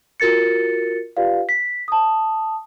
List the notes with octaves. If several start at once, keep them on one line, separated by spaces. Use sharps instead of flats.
F4 F#4 A#4 A6 C#7
F4 G4 B4 D5 F5
B6
A5 D#6